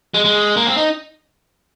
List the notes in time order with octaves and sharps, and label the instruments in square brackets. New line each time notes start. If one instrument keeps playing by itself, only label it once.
[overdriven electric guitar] G#3
G#3
A#3
C4
D#4